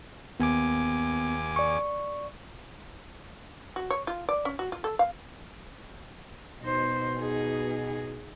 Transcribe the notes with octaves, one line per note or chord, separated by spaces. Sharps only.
D#2 B3 G#5 D6
D5 C#6
F#4
C#5
F4
D5
C#4
F#4
F4
A4
F5
B2 D#4 C5
D#4 G#4